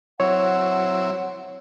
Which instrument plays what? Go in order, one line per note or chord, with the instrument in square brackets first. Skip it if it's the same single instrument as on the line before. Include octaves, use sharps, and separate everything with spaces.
[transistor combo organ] F#3 C4 E4 [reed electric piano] C#5 [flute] F#5